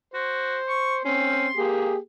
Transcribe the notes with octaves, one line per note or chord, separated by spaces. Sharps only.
F#4 C5
C#6
C4 C#4 C6
A#3 G4 G#4